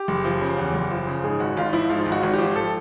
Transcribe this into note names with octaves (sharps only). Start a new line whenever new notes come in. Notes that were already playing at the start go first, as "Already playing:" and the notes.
Already playing: G4
F#1
F3
C#3
E2
F#1
F3
C#3
G#2 G#4
G#1 F#4
G#1 F4
F3 E4
G#2 F4
G#1
F#4
G#1
F3 G4
A4